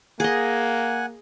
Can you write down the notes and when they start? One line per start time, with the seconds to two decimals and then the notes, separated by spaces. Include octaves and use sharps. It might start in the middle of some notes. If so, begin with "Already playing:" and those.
0.20 A#3 G#4 D#5 F#5 G#5